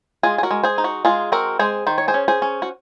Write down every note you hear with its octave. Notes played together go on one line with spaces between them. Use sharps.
G#3 F4 G#4
G#4
F#4 A#4
G#3
G#4 C5
D#4
F#4
G#3 F4 G#4
C4 F#4 A#4
G#3 G#4 C5
D#3 C5
C#5
G#4 C5
C#4
G#4 C5
C#4
F#4